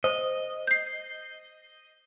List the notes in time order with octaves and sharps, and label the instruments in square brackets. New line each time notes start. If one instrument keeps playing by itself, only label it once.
[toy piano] C5 [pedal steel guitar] D#5
[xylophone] G6 C7